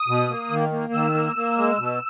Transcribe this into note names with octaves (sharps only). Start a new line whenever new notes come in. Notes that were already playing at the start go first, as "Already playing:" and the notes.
Already playing: D#6
B2
A#3
D#3
A#3
D#3 E6
A#3
A#3
G#3
B2